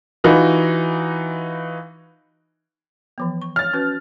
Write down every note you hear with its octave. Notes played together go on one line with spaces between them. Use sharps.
E3 D#4 F4 F#4
E3 F3 B3
C#6
C#5 F6 A6
C#4 F#4 B4